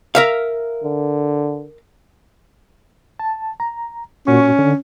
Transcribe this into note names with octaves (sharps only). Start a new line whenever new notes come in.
A#4 E5 F5
D3
A5
A#5
A#2 C#4 F#4 C#6
D3